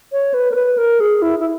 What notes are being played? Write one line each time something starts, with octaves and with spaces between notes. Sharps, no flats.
C#5
B4
A#4
B4
A#4
G#4
E4
E4